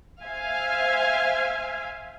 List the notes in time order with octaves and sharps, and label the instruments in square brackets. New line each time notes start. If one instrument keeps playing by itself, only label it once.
[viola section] C5 E5 F5 G#5